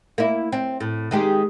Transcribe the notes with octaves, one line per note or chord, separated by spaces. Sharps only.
A#3 E4
C4
A2
D#3 G#3 G4